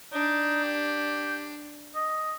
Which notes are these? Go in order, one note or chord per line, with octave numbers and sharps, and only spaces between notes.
D4 D#4
G4
D#5